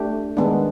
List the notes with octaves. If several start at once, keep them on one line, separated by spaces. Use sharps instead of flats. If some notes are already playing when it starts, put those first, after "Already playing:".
Already playing: A3 D4 G4
D#3 G#3 B3 D4